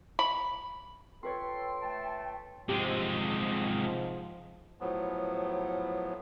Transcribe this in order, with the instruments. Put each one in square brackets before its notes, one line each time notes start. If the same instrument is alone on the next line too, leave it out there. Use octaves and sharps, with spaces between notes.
[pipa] B5
[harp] F4 B4 C#5 [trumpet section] A4 [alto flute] G5 [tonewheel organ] C6
[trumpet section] A3 A5
[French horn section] G#2 F3 [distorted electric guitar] C3 G#3 [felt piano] G4
[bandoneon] A2 F3 F#3 B3